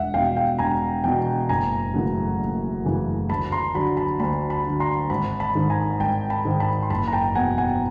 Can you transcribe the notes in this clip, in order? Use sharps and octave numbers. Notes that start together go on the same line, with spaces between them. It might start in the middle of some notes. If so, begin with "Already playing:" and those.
Already playing: E1 E5 F#5
E2 B2 F5 G5
F5 G5
E1 G#5 A#5
E2 B2 G5 A5
F#1 G#5 A#5
F#2 C#3 E3 A3
F#1
F#2 C#3 E3 A3
D2 A5 B5
A#5 C6
D3 F#3 A5 B5
A5 B5
D2 A5 B5
A5 B5
D3 F#3
A#5 C6
G#1 A5 B5
A5 B5
G#2 D#3
G#5 A#5
G#1 G5 A5
A5 B5
G#2 D#3
A5 B5
C6
F#1 A5 B5
A#5
G5 A5
E2 B2 F#5 G#5
F#5 G#5